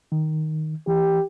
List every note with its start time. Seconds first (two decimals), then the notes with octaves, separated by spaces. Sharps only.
0.12 D#3
0.87 E3 G4